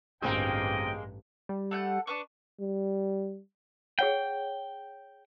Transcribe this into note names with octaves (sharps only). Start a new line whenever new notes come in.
A1 D2 G2 G#3 A#3 C4 D#5 G5
G3
A3 F#5 G6
D4 B4 C#6
G3
G#4 C#5 F#5 G5